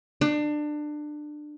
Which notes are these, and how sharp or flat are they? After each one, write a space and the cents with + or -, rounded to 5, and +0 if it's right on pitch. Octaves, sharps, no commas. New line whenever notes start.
D4 +25